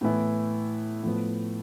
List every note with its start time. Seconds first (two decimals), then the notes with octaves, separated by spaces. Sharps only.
0.01 A2 E3 B3 E4
1.03 A2 F3 B3